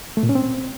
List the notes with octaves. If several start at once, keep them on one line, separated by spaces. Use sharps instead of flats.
A3
A#2
C#4
C4